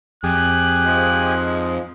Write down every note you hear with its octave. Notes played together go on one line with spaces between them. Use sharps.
F2 G4 G#4 F#6
G#2 F3 G#3